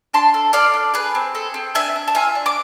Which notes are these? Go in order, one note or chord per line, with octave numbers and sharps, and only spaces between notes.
D4 A5 C6
A4
A4 D5 F5
D4
G#4 B4
C4
G#4 A4
C4
D4 E5 G#5
D4
A5
F4 E5 G#5
D4
D6